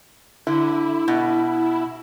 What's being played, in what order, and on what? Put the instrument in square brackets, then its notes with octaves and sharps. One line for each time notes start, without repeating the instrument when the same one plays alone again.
[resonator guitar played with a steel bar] D3 [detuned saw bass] E4
[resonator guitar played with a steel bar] B2